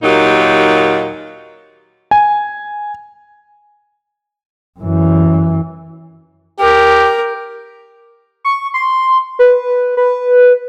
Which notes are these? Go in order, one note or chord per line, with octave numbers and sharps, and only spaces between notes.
D#2 A#2 F#3 D#4 G4
G#5
F#2 E3
G4 A#4
C#6
C6
B4
B4